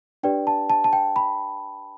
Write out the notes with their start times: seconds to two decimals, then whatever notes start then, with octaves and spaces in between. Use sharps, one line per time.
0.23 D4 G4 B4 D5 G5
0.47 A5
0.70 A5
0.84 A5
0.93 G5
1.16 B5